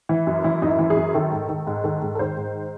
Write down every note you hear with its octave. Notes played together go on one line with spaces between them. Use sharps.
E3
F#2
E3 E4
F#2 D#4
E4
E3
G#4
F#2
D#3 A4
G#2
D#3
G#2
D#3 A4
G#2
A4
D#3 C5
G#2